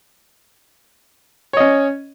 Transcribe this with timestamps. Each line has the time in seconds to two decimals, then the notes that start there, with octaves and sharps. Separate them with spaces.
1.53 C#5
1.57 D#5
1.60 C#4